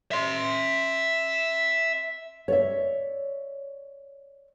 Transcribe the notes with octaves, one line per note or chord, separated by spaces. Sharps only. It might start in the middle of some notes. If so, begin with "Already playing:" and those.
E5 C6
C#5 D5 E5